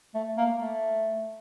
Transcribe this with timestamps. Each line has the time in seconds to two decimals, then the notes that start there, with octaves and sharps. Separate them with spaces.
0.15 A3
0.37 A#3
0.59 A3